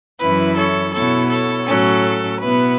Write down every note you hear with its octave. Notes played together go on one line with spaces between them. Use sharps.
F#2 E3 C#4 E4 B4
A4 C#5
B2 B3 E4 A4 C#5
A4 C#5
A2 F#3 C#4 A4
B2 B3 E4 B4